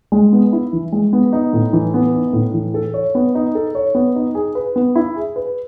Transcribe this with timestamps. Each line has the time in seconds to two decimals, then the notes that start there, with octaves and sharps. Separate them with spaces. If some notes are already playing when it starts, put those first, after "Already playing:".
0.12 G#3
0.32 B3
0.53 E4
0.73 E3
0.92 G#3
1.13 B3
1.33 D#4
1.53 A2
1.73 E3
1.94 B3
2.14 D#4
2.33 A2
2.54 E3
2.74 A4
2.94 C#5
3.15 B3
3.35 D#4
3.55 A4
3.75 C#5
3.95 B3
4.15 D#4
4.35 G#4
4.55 B4
4.76 B3
4.96 E4
5.16 G#4
5.36 B4